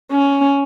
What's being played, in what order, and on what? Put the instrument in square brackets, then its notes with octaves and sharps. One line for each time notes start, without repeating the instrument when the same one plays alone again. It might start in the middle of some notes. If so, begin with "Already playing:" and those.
[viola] C#4